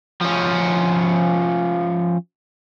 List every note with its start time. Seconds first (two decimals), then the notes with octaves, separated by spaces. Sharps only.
0.21 F3 C#4